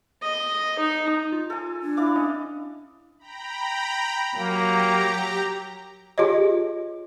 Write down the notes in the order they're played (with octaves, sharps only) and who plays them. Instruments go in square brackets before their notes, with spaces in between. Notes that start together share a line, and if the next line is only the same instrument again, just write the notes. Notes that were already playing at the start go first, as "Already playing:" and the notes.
[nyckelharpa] D#5
D#4
[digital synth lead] F4
[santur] A4 G#5
[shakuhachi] D4
[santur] E4 D5 F5 [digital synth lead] D6
[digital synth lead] C#4 [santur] D#5
[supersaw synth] G5 A#5 B5
[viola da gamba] F#3 [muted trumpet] A#3 [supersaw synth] G4 A#5
[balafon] F4 G4 G#4 C#5 D#5